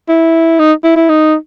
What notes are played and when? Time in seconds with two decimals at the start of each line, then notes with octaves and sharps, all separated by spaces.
0.09 E4
0.59 D#4
0.84 E4
0.96 E4
1.09 D#4